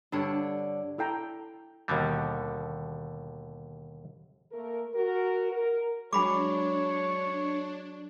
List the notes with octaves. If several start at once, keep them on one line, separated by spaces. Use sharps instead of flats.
G2 D3 D4 C#5
E4 A4 G5 A#5
D#2 B2 D3 G3
A3 A#3 A#4
F#4 A#4
A#4
F#3 G#3 D4 C#5 G#5 B5 D6